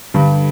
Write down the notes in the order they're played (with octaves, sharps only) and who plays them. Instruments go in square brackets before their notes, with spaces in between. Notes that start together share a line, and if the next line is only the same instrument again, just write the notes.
[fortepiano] G2 G3 [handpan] D3